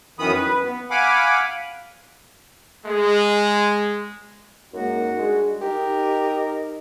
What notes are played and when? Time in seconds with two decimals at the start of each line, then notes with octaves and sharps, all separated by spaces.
0.19 F#2 D#3 E3 B3 B5 D#6
0.33 B4
0.63 B3
0.90 F5 F#5 G#5 B5 D6
2.86 G#3
4.73 F#2 G#3 A#3 D#4 F#4
5.18 G3 G#3 D4
5.62 D#4 G4 A#4 D#5